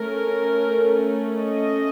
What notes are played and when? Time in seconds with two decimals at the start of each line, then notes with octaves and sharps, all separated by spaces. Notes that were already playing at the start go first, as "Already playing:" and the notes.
Already playing: A3 C#4 A#4
1.40 D#5